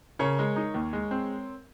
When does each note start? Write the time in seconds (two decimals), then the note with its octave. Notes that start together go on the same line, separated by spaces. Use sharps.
0.19 C#3 A#4 C#5
0.39 G#3
0.56 D#4
0.74 D#2
0.93 G#3
1.11 C4